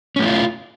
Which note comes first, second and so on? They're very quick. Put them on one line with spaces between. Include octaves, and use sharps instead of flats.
C#4 A3 E4 F4